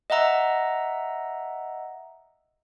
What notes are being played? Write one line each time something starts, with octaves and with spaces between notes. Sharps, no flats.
D#5 E5 F#5 A#5 E6